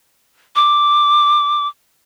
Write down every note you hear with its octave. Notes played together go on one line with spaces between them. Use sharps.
D6